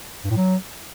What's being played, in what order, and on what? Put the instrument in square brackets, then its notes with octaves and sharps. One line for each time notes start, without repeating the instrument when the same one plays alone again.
[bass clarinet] G2
A2
F#3